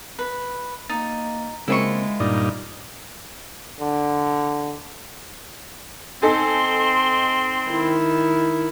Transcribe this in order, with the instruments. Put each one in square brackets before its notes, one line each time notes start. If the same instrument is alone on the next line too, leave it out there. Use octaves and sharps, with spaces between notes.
[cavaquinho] B4
[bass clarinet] A#3 [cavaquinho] D#4 [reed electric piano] A6
[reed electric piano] C#3 A#3 C4 [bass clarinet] G#3 [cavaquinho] E4 F4 C#6
[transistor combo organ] G2 A#2 D#4 [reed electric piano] D5
[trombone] D3
[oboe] C4 [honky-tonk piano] D#4 A4 G#5 [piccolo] C6
[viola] D#3 E4